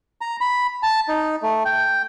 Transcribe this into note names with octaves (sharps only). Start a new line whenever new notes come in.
A#5
B5
A5
D#4
A3
G5